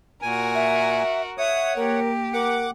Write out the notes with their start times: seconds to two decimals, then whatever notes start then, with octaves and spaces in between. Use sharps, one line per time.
0.22 A#2 F#4 A#4 G#5
0.54 E5
1.38 C#5 E5 F#5 D#6
1.76 A#3 G4 A#4
2.33 A#4 F#5 D6